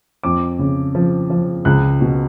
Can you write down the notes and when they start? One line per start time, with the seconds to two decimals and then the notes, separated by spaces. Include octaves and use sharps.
0.23 F2 D6
0.59 C#3
0.95 F3
1.30 F3
1.65 C#2 F#6
2.01 B2